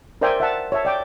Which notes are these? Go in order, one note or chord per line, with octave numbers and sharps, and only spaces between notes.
A#4 C5 D5 E5 G5 G#5
E5 F#5 A5
C#5 E5 A5
D5 G5 D6